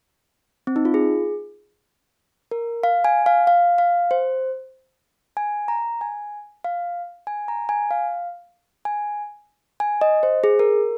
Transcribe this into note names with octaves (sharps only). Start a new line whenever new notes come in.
C4
D#4
F4
G#4
A#4
F5
G#5
F5
F5
F5
C5
G#5
A#5
G#5
F5
G#5
A#5
G#5
F5
G#5
G#5
D#5
C5
G#4
A#4